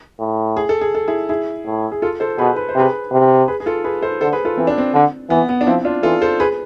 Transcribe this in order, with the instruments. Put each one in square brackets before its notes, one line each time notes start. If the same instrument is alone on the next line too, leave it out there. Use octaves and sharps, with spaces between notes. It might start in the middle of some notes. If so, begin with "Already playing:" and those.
[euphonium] A2
[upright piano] G#4
A4
G#4
A4
E4 G#4
E4 G#4
[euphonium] A2
[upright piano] G#4
F4 A4
A4 C5
[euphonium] B2 [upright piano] G#4 B4
[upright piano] B4
C5
[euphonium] C3 [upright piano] G#4 B4
[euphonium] C3
[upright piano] G#4 B4
G#4
F4 A4
G#4 B4
A4 C5
[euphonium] D3 [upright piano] A4 C5
[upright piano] G#4 B4
F4 A4
[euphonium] E3 [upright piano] C4
[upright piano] D4
C4
[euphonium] D3
[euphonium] E3 [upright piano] B3
[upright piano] B3
D4
[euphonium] F3 [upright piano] C4 E4
[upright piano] D4 F4
[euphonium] E3 [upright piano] F4 A4
[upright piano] A4 C5
G#4 B4